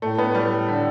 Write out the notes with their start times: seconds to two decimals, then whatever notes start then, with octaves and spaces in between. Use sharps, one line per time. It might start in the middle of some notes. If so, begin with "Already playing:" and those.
0.02 A2 A3
0.18 B3
0.35 G3
0.68 D3